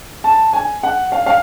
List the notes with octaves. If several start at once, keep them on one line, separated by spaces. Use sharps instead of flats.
A5
G#5
F#5
F5
F5